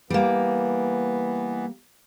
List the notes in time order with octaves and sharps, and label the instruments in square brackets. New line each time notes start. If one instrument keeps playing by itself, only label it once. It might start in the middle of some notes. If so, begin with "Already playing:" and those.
[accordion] E3 B3 [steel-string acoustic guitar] G3 A#3